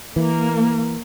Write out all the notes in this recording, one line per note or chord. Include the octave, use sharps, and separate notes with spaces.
E3 A#3